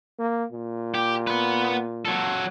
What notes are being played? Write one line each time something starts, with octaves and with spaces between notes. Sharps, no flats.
A#3
A#2
G4
B3 B4
F#3 A4